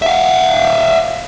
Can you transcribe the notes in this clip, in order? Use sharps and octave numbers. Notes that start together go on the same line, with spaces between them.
E5 F5